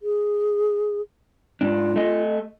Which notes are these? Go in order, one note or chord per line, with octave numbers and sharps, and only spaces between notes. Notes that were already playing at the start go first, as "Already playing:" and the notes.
G#4
G#2 D4 F4
A3 D#5